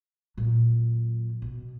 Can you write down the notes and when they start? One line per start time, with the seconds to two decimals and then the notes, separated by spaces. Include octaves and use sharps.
0.37 A#2 F#3
1.42 B2